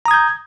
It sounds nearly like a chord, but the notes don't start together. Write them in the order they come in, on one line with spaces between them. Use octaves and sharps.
A#5 D#6 G#6 G6